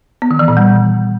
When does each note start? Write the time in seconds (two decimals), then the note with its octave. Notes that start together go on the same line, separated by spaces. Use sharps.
0.22 B3
0.31 D#3
0.39 E3
0.48 A#2
0.57 G3